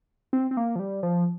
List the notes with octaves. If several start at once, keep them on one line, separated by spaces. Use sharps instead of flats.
C4
C4
A#3
F3
G3
F3